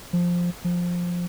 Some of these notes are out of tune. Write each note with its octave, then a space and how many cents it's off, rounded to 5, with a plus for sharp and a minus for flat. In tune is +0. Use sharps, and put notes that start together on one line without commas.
F3 +5
F3 +10